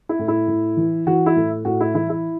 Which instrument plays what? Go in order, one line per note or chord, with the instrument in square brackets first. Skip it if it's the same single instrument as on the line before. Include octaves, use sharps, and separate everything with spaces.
[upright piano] E4
A2
E4
A2
E3
E3 F#4
E4
A2
A2 F#4
E4
E3 E4
E4